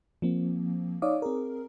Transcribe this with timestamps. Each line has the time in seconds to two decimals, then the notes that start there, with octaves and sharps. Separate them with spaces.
0.22 F3 A#3 C4
1.02 D#4 C#5 D5 F5 D6 D#6
1.22 C4 G#4 A#4